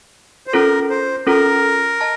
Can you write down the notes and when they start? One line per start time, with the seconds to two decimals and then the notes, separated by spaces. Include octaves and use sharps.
0.47 C5
0.53 C#4 F4 A4 A#4
0.90 C5
1.26 C#4 F4 A4 A#4
2.01 D#5 A5